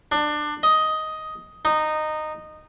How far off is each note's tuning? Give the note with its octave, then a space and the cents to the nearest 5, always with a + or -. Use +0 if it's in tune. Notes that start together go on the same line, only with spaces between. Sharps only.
D4 +25
D#5 +10
D#4 -15